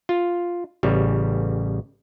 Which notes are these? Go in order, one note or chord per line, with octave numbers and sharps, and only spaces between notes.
F4
A1 C#3 G3